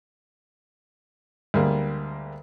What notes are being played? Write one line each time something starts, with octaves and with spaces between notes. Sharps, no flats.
D2 G3 G#3 A#3